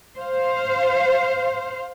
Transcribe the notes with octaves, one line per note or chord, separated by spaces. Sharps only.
C5 F5